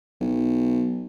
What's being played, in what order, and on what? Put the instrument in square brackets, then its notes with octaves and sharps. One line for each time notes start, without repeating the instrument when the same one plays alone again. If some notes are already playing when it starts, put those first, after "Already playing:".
[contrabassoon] B1